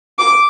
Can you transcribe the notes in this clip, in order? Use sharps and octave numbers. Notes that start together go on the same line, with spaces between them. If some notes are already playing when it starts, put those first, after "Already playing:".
D6